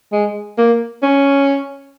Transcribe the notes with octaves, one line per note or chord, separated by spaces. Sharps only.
G#3
A#3
C#4